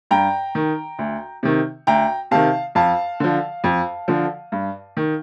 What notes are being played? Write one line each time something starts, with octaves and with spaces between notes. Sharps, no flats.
G2 G5 A#5
D#3
D2
C3 D#3
D2 G5 A#5
C3 D#3 F5 A5
F2 F5 A5
D3 F3
F2
D3 F3
G2
D#3